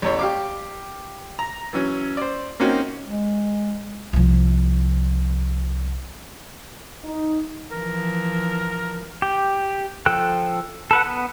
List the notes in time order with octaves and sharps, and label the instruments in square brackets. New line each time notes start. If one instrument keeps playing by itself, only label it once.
[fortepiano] A1 E2 C#5
G4 F5 D6
A#5
E3 F#3 C#4
C5 D5
A#3 C4 C#4 D#4 F#4
[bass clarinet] G#3
[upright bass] C2 F3
[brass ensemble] D#4
[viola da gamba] E3 F3 [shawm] A#4
[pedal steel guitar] G4
F3 A4 G5 F#6
A4 B4 F#5
B3